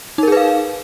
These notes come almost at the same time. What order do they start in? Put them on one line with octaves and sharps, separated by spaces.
D#4 A#4 G#4 B4 F5